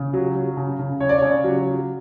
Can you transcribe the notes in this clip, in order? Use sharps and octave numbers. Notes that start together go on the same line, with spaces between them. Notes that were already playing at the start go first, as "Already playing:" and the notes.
Already playing: C#3
F#3
F#3
C#3
C#3
C#3 C#5
D5
C#3 C#5
F#3
F#3